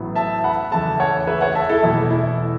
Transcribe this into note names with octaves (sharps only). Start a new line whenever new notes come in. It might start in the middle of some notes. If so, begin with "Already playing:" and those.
Already playing: A1 A2 F#3 B3
E5 A5
F#5 B5
E2 C#3 A3 E5 A5
C#5 F#5
B4 E5
C#5 F#5
E5 A5
E4 A4
E2 B2 A3 E4
E4